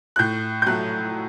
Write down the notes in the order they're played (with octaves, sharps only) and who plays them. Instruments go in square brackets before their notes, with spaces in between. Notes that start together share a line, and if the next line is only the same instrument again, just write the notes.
[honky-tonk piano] F#6
A2 G6
G6
F#3 A3 F#6